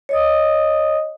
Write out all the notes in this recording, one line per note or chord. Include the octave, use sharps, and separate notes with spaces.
C#5 D#5 D#6